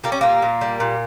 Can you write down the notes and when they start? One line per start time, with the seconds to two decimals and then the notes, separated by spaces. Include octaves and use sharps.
0.04 G3 A#3
0.12 C#4
0.21 A#2 A#3
0.42 A#2
0.61 G3
0.80 A#2